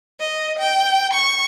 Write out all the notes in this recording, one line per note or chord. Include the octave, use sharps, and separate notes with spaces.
D#5
G5
C#6